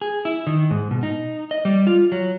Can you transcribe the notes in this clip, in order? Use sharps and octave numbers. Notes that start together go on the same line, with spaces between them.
G#4
E4
D#3
G#2
B2
D#4
D#5
G3
F4
F#3